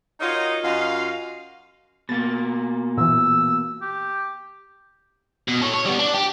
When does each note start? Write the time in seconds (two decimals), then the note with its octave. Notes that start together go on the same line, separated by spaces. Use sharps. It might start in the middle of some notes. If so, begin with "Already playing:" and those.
0.20 D#4 F4 F#4 A#4 C#5 D#5
0.63 F#2 F4 F#4 D#5 F5
2.09 B2 A#3 A6
2.97 A#2 E3 E6
3.82 G4
5.48 B2
5.62 A4 C#5
5.74 C#5
5.86 G3 B3
5.99 D4
6.14 G4